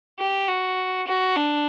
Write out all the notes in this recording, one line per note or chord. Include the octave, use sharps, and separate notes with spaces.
G4
F#4
F#4
D4